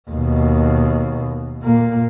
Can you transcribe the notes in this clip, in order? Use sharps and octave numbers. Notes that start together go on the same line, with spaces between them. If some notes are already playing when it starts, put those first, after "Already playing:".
D#2 B2
A#2 A#3